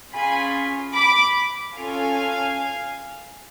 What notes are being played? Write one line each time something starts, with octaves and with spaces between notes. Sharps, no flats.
C#4 F4 G#4 G#5 B5
B5 D6
C#4 F4 A4 F5 G#5